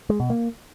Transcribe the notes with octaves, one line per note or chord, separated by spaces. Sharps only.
G#3
B2
A#3